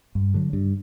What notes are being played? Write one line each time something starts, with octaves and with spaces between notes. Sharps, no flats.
G2
D3 F#3
G2